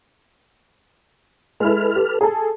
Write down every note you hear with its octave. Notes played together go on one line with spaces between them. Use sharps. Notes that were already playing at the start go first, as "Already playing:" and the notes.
G#3 E4 A4 B4 F6
G4
G#4 A4